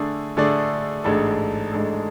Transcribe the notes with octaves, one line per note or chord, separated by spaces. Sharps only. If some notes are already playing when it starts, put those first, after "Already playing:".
Already playing: D3 A3 D4 G#4 D5
D3 A3 D4 G#4 D5
A1 G#2 G#3 D4 A4
A1 G#2 G#3 D4 A4